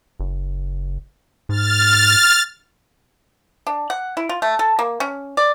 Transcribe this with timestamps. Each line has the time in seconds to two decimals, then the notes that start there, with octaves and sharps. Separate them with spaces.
0.20 F#1
1.49 G#2 F6 A6
3.67 D4
3.90 F#5
4.17 E4
4.29 F4
4.42 A3
4.59 A4
4.79 A#3
5.00 C#4
5.37 D5